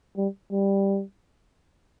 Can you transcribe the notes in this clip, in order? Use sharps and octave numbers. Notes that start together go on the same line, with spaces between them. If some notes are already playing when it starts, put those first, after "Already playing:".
G3
G3